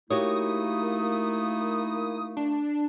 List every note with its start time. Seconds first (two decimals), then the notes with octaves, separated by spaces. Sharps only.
0.10 A3 A#3 D#4 E4 F#4 G4 C#5 D#6
2.37 D4